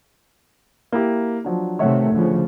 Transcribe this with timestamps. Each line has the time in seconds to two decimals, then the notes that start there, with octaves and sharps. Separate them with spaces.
0.92 A#3 E4 G4
1.45 F3 F#3 D4
1.79 C3 D#3 A3 C#5 E5 F#5
2.12 D2 C#3 F3